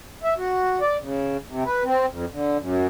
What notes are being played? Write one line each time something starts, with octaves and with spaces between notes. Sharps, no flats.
E5
F#4
D5
C#3
C3
B4
C4
F2
D3
F#2